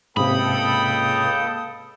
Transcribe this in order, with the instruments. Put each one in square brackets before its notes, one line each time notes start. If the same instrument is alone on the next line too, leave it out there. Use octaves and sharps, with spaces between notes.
[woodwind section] C#2 A#3 D#6 [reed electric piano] G#2 C3 [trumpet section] A4 G5 [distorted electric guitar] B5